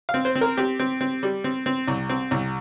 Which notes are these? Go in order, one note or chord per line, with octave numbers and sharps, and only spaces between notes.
F5
C4
C5
C4
A#4
C4 G4
C4
C4
G3
C4
C4
C2
C4
C2